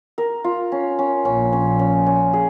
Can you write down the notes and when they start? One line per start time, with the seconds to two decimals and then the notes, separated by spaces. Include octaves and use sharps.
0.18 A#4
0.44 F4
0.72 C#4
0.99 C#4
1.25 A#1 A#2 C#4
1.53 C#4
1.79 C#4
2.06 C#4
2.33 G#4